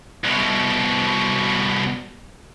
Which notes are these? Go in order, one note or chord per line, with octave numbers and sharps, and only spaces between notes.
C2 B2